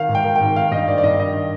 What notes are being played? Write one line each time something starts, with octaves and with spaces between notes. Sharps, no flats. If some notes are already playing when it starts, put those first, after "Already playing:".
Already playing: D#3 F5
G#2
G5
D#3
G5
G#2
D#3 F5
G2 D#5
D#3 D5
D5
G2 D#5
D#3 D#5